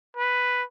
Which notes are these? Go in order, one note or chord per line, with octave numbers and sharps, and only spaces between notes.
B4